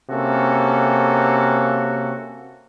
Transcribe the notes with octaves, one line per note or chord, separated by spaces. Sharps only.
C3 A#3 C#4 F#4 A4